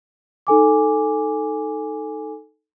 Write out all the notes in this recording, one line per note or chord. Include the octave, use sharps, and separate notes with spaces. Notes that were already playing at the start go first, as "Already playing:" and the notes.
D#4 A4 G#5 D6